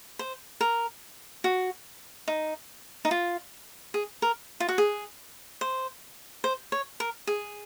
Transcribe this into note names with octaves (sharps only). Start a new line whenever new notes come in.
C5
A#4
F#4
D#4
D#4
F4
G#4
A#4
F4
F#4
G#4
C5
C5
C#5
A#4
G#4